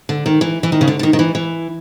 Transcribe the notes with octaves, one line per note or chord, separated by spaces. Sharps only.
D3
D#3
E3
E3
D#3
C#3
D3
D3
D#3
D#3
E3
E3